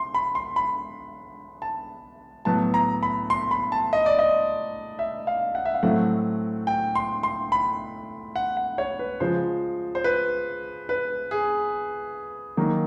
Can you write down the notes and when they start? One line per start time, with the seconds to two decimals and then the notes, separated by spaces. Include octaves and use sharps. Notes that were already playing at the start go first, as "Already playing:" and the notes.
Already playing: C6
0.15 B5
0.35 C6
0.56 B5
1.62 A5
2.45 A2 F#3 B3 A5
2.74 A#5
3.03 B5
3.30 C6
3.51 B5
3.72 A5
3.93 D#5
4.06 D5
4.19 D#5
4.99 E5
5.27 F5
5.55 F#5
5.66 E5
5.74 F5
5.83 A2 F#3 A3 C4 F#5
6.67 G5
6.95 C6
7.23 C6
7.52 B5
8.36 F#5
8.57 F#5
8.78 C#5
8.99 B4
9.20 C#3 F3 G#3 C5
9.95 C5
10.04 B4
10.89 B4
11.31 G#4
12.57 D#3 F#3 A#3